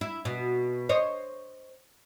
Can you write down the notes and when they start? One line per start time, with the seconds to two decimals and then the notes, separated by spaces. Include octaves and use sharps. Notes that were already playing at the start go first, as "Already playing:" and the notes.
0.01 E4
0.25 B2
0.89 C5 C#5 D#5